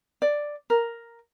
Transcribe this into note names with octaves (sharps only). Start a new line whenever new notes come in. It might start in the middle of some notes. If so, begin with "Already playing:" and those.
D5
A#4